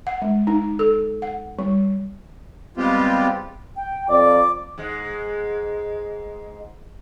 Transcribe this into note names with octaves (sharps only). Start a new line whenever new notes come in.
F#5
G#3
D#4
A4
F#5
G3
G3 G#3 B3 C4 F4 G4
G5
F2 D5 D6
G#2 G#3